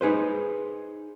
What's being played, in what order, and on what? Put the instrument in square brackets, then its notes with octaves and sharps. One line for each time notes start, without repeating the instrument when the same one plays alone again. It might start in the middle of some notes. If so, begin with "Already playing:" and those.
[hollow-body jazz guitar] D#4 G#4 B4 C5